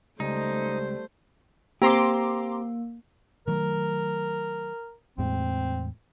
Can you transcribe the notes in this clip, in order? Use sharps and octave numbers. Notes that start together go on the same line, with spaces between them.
C#2 G3 A3 D#4 C5
A#3 C4 G4 A#5 C6 D6
D#3 F#3 A3 A#4
E2 A2 G#3 C4